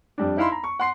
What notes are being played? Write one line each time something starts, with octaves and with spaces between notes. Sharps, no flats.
F2 G3 D4
D#4 E4 F5 B5 C6
A#5 B5
C#6
F#5 C6 C7